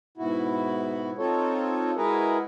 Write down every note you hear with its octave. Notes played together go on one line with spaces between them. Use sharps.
G#2 B2 E4 F#4
C4 D#4 F4 A4 C#5
G#3 E4 F#4 G#4 A#4 B4